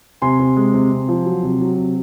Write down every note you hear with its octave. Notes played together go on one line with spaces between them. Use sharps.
C3 G#5 C6
C3
G#3
C3
C3
F3
F#3
C3
F#3
C3